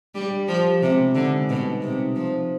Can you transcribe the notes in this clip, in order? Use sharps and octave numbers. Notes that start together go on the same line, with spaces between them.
G3 D4
D5
F3 G4
D4
C3 G#3
B3
D3 D#4
G#3
B2 G3
D#4
C3 D#4
D#4
F3 C5
C5